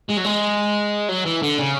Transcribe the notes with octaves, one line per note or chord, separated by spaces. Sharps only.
G#3
F#3
G#3
F#3
E3
D3
C#3